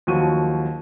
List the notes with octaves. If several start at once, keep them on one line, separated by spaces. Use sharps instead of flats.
D#2 F3 F#3 C#6 D#7